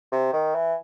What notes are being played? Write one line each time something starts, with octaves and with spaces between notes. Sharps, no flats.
C3
D#3
E3